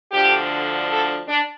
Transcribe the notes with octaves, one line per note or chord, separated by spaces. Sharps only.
D2 D3 F3 D4 G4
A4
D4